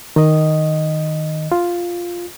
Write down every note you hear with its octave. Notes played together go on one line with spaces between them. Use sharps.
D#3 D#5
F4